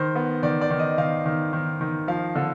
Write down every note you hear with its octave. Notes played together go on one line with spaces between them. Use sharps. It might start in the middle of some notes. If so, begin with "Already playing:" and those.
Already playing: D#3 C5
B3
D#3 D5
D5
D#3
D#5
D#3 F5
D#3
D#3
D#3
F3 F5
D3